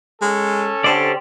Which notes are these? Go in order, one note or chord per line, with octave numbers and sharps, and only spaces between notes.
G#3 C#4 A4
D3 G4 C5 D5